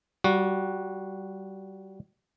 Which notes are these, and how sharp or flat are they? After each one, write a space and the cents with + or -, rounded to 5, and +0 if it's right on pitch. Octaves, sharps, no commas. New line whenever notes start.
G3 -25 F#4 -10